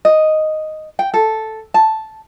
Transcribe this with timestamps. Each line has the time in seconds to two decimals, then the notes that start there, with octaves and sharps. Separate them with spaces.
0.05 D#5
0.99 G5
1.14 A4
1.74 A5